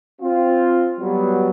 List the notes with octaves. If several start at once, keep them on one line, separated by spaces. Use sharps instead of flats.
C4 F4
F#3 G3 B3